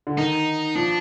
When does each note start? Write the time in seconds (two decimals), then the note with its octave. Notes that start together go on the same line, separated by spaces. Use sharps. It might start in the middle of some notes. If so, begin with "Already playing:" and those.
0.07 D3
0.18 D#3 D#4
0.75 F3 D4